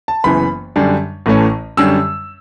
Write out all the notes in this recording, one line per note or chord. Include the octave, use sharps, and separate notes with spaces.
A5
F#1 F#2 E3 B3 B5
F#2 D3 G3 D4
A1 A2 E3 A3 C#4
F#2 D3 G3 C#4 E6